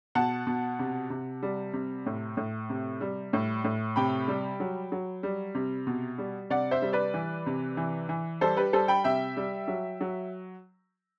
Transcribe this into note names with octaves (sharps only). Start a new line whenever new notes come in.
B2 F#5 A5
B2
C3
C3
G3
C3
A2
A2
C3
G3
A2
A2
C3 G5 B5
G3
F#3
F#3
G3
C3
B2
G3
C3 D5 F#5
C5 E5
G3
B4 D5
E3
C3
E3
E3
G3 A4 C5
G4 B4
G3 A4 C5
G5 B5
C3 E5 G5
G3
F#3
F#3